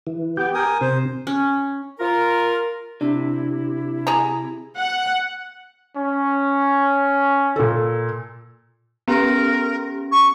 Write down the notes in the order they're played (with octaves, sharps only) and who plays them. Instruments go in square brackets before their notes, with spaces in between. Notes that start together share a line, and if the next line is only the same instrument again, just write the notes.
[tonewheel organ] E3
[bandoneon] B3 [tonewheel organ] G4 G5
[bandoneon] A#4 G#5 D#6
[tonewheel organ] C3 [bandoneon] C5
[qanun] C#4
[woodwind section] F4 A#4
[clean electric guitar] C3 [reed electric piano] D4 [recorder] E4
[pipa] G#4 A5 A#5
[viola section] F#5
[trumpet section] C#4
[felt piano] A#2 A4
[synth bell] B3 C#4 G4 [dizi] A#4
[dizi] C#6